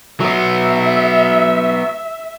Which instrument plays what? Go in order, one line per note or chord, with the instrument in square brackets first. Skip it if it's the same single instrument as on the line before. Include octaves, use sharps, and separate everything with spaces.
[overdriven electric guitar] F#3 B3 [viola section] E5